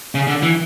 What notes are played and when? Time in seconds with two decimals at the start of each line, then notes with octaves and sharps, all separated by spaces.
0.15 C#3
0.27 D3
0.43 E3